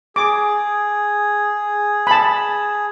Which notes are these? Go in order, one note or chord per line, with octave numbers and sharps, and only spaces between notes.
G#4 D6
A5 B5